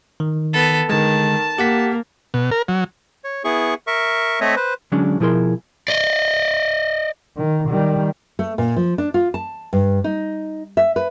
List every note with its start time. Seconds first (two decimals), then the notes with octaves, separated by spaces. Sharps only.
0.20 D#3
0.53 B3 A4
0.90 D3 D#3 G#3 A5
1.58 A#3 G4 F#5 B6
2.34 B2
2.51 A#4
2.68 F#3
3.24 C#5
3.44 B3 E4 G#4 C#6
3.87 A#4 E5 C#6
4.41 A3 C4 C#5 D#5 E5
4.56 B4 C5
4.92 D3 F#3 G#3 C#4 D4
5.20 B2 F3 E4 G#4 A#4 C6
5.88 D5 D#5
7.37 D#3
7.68 D#3 G3
8.39 A3
8.58 A#2
8.76 F3
8.98 D4
9.14 F4
9.34 A5
9.73 G2
10.04 D#4
10.77 E5
10.96 B4